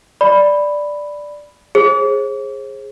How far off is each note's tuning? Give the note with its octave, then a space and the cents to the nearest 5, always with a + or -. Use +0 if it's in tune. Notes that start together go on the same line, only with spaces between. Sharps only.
D5 +0 B5 +0
G#4 -5 C5 +45